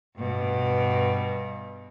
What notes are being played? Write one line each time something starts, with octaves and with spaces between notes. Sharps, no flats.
G2 B2